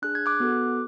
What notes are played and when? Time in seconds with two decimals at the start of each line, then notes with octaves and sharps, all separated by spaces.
0.02 D4 G#4 F#6
0.15 G#6
0.26 D6 F#6
0.40 B3 F#4 A4